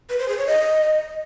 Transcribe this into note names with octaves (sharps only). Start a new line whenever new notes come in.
B4
C5
G#4
C#5
D#5